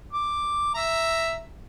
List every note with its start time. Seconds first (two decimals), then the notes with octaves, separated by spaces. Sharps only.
0.12 D6
0.74 E5 A#5